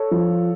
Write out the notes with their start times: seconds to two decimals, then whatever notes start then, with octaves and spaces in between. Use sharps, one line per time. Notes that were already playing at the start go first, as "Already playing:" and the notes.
Already playing: A4 C#5
0.11 F3